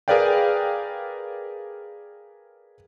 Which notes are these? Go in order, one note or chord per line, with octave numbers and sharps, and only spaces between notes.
G#4 A#4 B4 D5 F5 G5